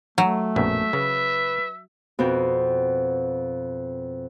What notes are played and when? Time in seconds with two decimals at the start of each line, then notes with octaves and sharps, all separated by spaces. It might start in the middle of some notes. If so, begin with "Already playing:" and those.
0.18 F#3 A3
0.56 A#1 F#2 B2 E5
0.93 C#3 B4
2.19 F2 B2 C4